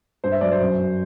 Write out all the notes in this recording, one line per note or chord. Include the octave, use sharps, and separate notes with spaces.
G2 C5
E5
F#3 D5
C5
F#2
F#3